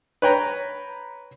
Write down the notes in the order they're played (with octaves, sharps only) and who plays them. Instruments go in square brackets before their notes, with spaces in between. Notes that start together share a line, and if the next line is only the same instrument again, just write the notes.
[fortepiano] B4 C#5 G5 A#5